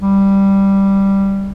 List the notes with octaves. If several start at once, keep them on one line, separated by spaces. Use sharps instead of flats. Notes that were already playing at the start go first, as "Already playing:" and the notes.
G3